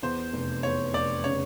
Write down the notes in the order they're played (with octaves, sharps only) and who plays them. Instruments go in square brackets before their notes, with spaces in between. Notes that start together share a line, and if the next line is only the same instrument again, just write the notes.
[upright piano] E2 [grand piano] C5
[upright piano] F1
[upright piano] E2 [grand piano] C#5
[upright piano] F1 [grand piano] D5
[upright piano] C#3 [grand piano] C#5